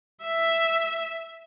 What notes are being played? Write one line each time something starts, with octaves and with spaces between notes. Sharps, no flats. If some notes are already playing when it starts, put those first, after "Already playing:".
E5